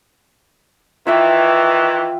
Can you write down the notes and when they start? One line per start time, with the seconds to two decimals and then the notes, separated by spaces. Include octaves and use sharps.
1.07 D#3 E3 F4 E5 G5